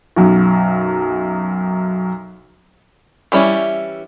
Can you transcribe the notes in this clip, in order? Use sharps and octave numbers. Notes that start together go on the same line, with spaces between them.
B1 F#2
E3 G3 C#4 E4